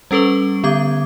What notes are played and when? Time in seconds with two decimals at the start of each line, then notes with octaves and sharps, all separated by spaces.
0.11 G3 C#4 A4 B4 C#6
0.64 D3 B3 D6 G#6